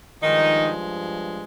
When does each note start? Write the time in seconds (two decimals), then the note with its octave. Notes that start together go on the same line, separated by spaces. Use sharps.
0.22 G2 D#3 F3 G#3 D#4